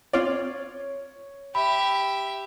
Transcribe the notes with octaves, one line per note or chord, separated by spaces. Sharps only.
C4 F4 C#5 D5
G4 E5 B5